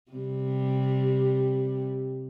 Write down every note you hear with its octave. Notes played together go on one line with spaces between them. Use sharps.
C3 G3